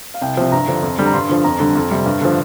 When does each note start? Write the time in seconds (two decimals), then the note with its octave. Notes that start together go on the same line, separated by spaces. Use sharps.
0.14 F5
0.22 C2 G5
0.37 C3 F3
0.52 G2 A#5
0.68 D3 F3
0.83 F2
0.99 D3 G3
1.07 A#5
1.14 G2 C6
1.29 D3 F3
1.44 F2 A#5
1.60 D3 G3
1.75 F2
1.91 C3 G3
2.06 G2
2.21 D3 F3